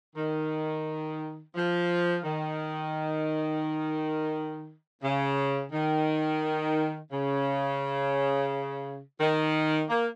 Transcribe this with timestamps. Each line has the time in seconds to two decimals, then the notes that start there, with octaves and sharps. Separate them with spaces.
0.16 D#3
1.55 F3
2.25 D#3
5.03 C#3
5.72 D#3
7.12 C#3
9.21 D#3
9.90 A#3